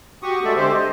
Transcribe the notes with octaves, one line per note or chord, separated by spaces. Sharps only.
F#4 G4 C#6 D#6
G#3 A3 A4 D5 E5
D3 G#3 C4 G4 C5
D#5